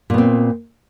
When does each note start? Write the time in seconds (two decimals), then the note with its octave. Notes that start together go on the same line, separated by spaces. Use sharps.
0.10 A#2
0.14 B3
0.18 C4